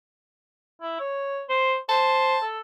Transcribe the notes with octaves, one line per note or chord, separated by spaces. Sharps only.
E4
C#5
C5
C5 A5
A4